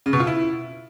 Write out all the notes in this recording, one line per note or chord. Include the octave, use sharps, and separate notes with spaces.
C#3
B2
F4
E4